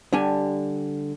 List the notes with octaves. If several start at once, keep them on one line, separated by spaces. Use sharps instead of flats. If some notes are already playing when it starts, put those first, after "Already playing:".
D3 G3 D4 G4 G#5